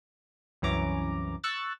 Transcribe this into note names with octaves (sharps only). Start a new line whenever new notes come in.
C2 F#2 E3 C#4 A#5 D6
C#6 E6 F#6 A6